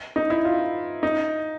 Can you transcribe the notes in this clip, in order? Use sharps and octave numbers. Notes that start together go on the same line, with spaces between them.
D#4
E4
F4
D#4